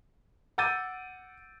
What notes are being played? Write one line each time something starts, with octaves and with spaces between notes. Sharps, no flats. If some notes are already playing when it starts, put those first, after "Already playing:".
F#5 D6 E6 G6 A6 D#7